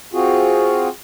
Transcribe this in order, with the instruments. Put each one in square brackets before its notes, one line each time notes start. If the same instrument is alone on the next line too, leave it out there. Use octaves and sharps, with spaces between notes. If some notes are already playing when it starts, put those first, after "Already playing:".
[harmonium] C4 F4 F#4 G#4